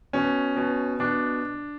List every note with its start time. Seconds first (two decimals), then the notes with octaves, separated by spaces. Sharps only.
0.13 B2 C#4
0.56 B2
1.00 B2 D4